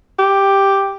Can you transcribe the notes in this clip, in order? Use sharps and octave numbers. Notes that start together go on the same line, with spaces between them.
G4